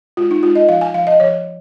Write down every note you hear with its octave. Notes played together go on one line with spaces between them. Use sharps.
G#3 F4
D#4
G#3 F4
D#5
F3 F5
G#5
F3 F5
D#5
F3 C#5